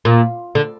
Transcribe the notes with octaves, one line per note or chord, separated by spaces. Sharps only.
A#2
D3